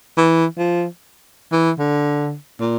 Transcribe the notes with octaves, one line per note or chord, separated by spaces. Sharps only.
E3
F3
E3
D3
A#2